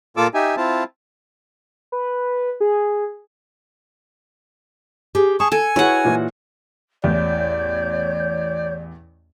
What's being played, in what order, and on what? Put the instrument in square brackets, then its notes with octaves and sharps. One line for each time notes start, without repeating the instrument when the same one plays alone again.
[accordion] A#2 A#3 F4 A4 D6 E6
D#4 G4 E5 G#5
C4 E4 F4 A5
[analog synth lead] B4
G#4
[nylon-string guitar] G4 G#4
[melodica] G#4 C#6 [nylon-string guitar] A5
[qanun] A4 [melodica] G#5
[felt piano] E4 B4 [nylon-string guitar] F#4 G#4 [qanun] C#5 F#5
[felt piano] A#2 E3
[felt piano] A1 E2 [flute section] C#5 G6 [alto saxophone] D5